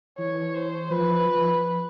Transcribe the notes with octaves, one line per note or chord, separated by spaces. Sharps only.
E3 C#5
C5
F3 B4
F3